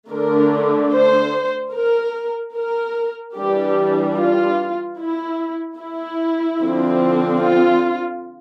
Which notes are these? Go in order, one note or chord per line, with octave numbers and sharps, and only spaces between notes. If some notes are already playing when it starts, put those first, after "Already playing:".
D3 A3 D4 A#4
C5
A#4
A#4
E3 G3 D4 G4
F4
E4
E4
D3 F3 C4
F4